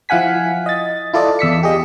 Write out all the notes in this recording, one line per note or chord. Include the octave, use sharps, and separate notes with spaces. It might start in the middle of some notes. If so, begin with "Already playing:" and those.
F3 E4 F5 F#5 G#5 B6
D#5 A6
E4 F4 A4 D5 D#5
E2 E6 B6 C#7
G4 G#4 D#5